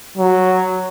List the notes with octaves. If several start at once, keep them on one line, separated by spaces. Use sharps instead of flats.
F#3